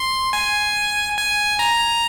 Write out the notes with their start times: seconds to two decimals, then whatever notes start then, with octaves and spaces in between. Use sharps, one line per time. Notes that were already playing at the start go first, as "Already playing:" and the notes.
Already playing: C6
0.33 G#5
1.17 G#5
1.59 A#5